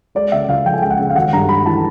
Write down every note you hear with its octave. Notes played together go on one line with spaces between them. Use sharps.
G#3 D5
C#3 E5
C#2 F5
F3 G5
G#5
G#3 G5
F#5
C#3
F5
G#1 F#5
G2 A#5
G#1 B5
E3 A5